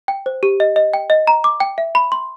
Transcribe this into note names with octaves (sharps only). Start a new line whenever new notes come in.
G5
C5
G4
D#5
D#5
G5
D#5
A#5
D6
G5
E5
B5
C6